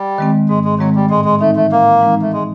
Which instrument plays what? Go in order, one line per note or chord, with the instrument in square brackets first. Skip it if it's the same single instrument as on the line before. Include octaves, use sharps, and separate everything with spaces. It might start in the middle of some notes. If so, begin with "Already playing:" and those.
Already playing: [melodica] G3
[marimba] D#3 G#3 C4
[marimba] G#2 [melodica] G#3
[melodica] G#3
[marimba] D#3 G#3 C4 [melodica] F#3
[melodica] G3
[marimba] A2 [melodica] G#3
[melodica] G#3
[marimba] E3 G#3 C4 D#4 [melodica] A3
[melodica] A3
[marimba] A2 [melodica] A#3
[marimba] E3 G#3 C4 D#4
[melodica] A3
G#3